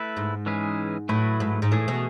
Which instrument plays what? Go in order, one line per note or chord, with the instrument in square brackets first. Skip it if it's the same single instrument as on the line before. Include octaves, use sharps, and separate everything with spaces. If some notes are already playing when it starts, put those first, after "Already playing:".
Already playing: [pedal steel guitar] A3 E4 B4
[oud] G#2
[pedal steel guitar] E3 G#3 C#4 G#4 B4
[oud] A2 [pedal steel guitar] F#3 A3 E4 B4
[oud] G#2
G#2
[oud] A2 [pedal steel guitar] E3 A3 E4 G#4
[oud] B2